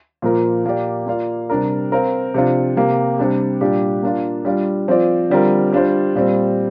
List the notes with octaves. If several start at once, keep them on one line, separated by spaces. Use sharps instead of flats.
A#2 F3 A#3 F4 A#4
A#2 A#3 G4 D5
A#3 F4 D5 F5
C3 G3 D4 A#4
C4 A#4 F5
C3 F3 D4 F4
C3 A#3 G4
C3 G3 D4 G4
A#2 G3 D4 G4
A#3 D4 F4
G3 D4 F4 D5 F5
F3 C4 F4 D5
D3 G3 C4 F4 A#4
G3 D4 F4 C5
A#2 G3 C4